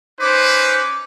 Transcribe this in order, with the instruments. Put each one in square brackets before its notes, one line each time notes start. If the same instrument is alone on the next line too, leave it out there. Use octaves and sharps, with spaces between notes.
[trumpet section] C#4 D#4 B4 [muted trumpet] C5 [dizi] D6